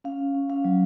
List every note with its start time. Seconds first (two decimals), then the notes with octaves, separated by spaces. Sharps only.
0.04 C#4 F5
0.20 C#4
0.35 C#4
0.50 C#4 F5
0.65 F#3